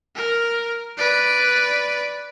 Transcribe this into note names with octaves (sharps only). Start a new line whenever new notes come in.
A#4
B4 D5